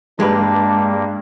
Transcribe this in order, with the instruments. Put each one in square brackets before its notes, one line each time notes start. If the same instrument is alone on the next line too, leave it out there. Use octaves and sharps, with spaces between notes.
[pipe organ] G2 A#3 [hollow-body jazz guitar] G#3 G4 B4 [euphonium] D4